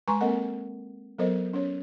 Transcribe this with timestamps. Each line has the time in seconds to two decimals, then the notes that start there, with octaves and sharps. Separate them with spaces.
0.08 G#3 B4 G#5 A#5 C6 C#6
0.21 A#3 C4 A4 A#4 D#5 F#5
1.18 F#3 B3 A4 A#4 C5 D#5
1.53 C#4 C#5